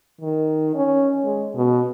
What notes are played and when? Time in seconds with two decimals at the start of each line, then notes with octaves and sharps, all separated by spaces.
0.21 D#3
0.75 C#4
1.25 G#3
1.56 B2